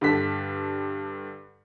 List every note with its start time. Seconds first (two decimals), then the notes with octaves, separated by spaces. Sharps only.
0.01 G2 D3 A4 B6